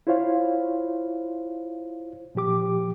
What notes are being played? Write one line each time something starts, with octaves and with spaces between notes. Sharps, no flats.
E4 F4 C5 C#5 F5
A#2 F3 G4 D6